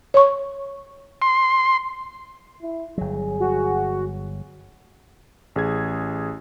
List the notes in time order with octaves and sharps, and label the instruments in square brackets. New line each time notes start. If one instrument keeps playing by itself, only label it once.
[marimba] C#5 C#6
[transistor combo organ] C6
[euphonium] E4
[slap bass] G1 F#3 [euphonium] G#4
[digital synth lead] F#4
[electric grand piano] A1 G#4 G#6